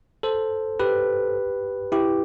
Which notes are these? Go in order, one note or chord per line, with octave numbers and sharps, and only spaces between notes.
A4 C5
G4 B4
E4 G4